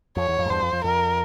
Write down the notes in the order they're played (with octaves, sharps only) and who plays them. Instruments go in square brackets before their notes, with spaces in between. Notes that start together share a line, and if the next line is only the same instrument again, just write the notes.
[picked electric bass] F2 [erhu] C#5
[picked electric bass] E2
F2
G#2
[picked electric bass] E2 G2 [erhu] C5
[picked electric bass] F2
F2
[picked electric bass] F2 [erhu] A#4